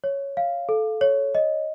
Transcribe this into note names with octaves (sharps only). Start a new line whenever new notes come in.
C#5
F5
A4
C#5
D#5